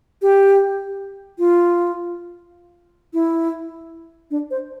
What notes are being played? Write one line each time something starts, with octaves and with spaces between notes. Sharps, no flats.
G4
F4
E4
D4
C5